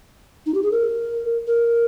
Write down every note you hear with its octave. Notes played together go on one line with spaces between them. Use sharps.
D#4
G4
G#4
A#4
A#4